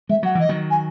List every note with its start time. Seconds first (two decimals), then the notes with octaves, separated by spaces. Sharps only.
0.09 G#3 E5
0.23 F#3 F#5
0.35 E3
0.40 D#5
0.49 D#3 F#3
0.70 G#5